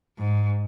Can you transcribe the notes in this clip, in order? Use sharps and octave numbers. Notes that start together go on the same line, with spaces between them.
G#2